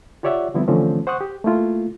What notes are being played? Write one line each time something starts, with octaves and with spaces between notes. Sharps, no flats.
F4 G4 C#5 D5 E5 F#5
D3 F3 G3 B3 C4 E4
D3 E3 F3 A3 C4 C#4
C5 F#5 C#6 D#6 F#6
G4
A3 A#3 E4 F4